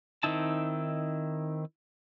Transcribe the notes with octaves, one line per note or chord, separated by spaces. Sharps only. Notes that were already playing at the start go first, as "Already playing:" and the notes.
D#3 C4 D#4 E4 A5